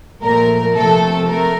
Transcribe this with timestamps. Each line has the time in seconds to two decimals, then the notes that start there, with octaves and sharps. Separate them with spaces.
0.23 A#2 F3 A3 A#4
0.76 C3 F3 A3 A4
1.29 A3 A#4